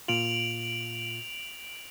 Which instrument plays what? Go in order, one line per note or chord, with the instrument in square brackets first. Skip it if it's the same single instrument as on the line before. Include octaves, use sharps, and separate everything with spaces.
[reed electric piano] A#2 F4 [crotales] D7 F7 F#7